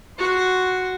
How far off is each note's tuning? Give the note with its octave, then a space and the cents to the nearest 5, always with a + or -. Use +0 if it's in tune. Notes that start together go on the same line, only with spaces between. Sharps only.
F#4 +0 C6 +0